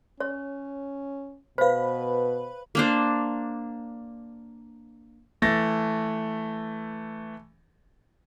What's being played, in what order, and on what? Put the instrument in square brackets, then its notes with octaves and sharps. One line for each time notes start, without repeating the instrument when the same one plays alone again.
[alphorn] C#4 [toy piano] C#5
[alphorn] B2 [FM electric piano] B4 B5 [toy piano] C5 F5
[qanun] A#3 D4 C5
[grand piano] E3 A3 A6 A#6